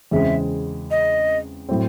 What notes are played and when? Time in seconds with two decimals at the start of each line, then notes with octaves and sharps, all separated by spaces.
0.11 E2 C#3 G#3 C4 E5
0.91 D#5
1.69 A2 F#3 C4